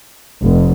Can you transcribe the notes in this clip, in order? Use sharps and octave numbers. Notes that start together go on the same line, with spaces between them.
F1